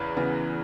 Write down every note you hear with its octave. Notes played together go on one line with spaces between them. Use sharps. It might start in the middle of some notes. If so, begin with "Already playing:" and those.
Already playing: E2 C#3 B4
C#3 E3 B3